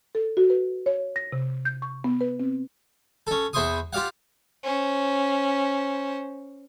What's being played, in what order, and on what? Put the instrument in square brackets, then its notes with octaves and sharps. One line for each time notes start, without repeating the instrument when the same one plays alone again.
[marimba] A4
F#4
B4
C#5
A#6
C3
G6
C#6
B3
B4
C4
[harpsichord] C#4 A4
E2 E4 C5 C6 C#6 D#6
F4 G4 D5 F5 F#5
[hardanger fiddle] C#4 C5